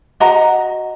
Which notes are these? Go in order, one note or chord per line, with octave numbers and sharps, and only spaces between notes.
F#4 D#5 F#5 A#5